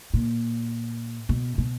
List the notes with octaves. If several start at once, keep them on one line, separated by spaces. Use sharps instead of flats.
A#2
B2
B2